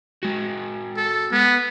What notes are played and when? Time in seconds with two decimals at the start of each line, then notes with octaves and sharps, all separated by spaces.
0.23 G#3 F#4
0.97 A4
1.31 B3